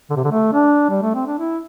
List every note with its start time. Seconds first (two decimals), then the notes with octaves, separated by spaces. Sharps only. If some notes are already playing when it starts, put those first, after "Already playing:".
0.10 D3
0.16 C3
0.24 D3
0.31 A3
0.53 D4
0.90 G3
1.02 A3
1.15 C4
1.27 D4
1.39 E4